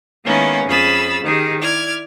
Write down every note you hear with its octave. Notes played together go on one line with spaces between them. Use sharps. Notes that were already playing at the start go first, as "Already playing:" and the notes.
D#3 G#3 A#3 B3 C#4 E4
F2 C#4 G#4 B5 E6 A6
D#3 G4 G#4
E4 D5 F6 G#6